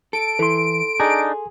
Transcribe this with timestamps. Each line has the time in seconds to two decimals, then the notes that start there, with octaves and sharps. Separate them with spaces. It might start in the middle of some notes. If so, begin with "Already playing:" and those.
0.13 A4 D7
0.39 E3 A4 C6
1.00 D4 D#4 G#4